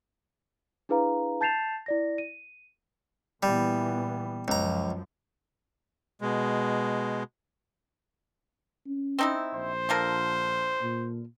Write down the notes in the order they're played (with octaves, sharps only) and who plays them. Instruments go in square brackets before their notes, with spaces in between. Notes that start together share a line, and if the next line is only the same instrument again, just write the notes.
[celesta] D4 E4 G#4 B4 F5 A#5
A5 G6 A6 C7 E7 F7
E4 D5 A#6
D#7
[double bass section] A#2 E3 B3 [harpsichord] G3
[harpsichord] C#2 A#5 [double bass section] F#2 F3
[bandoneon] B2 G#3
[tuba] C#4
[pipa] C4 D#4 E4
[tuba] A#1 [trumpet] C5
[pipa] D3 F3 A#4
[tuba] A#2